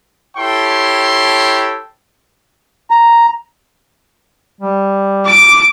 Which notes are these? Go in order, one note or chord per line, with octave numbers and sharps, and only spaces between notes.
E4 G4 A4 C#5 G5 C6
A#5
G3
D6 D7